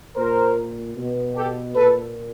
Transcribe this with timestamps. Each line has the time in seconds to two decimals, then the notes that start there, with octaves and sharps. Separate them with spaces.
0.16 A#2 A#4 C5
0.96 B2
1.36 G4 A4
1.75 A#2 A4 B4